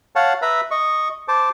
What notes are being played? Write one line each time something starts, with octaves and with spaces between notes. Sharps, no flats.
C#5 F5 F#5 A5
B4 E5 A#5 B5
D#5 C#6
C5 A5 D6